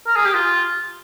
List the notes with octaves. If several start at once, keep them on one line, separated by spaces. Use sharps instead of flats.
A#4
G#4
G4
F4